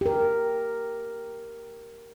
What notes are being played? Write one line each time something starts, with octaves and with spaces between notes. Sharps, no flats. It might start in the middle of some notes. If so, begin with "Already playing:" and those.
G4 A#4